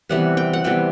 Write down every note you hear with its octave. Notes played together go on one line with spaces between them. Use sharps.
C3 E3 G3 B3 F#5
G5
F#5
C3 E3 G3 B3 G5